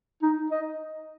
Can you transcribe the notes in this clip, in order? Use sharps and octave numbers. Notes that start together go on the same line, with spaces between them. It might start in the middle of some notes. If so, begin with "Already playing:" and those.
D#4
D#5